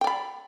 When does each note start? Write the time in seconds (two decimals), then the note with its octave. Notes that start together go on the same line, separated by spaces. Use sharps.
0.01 G5
0.04 D5
0.07 B5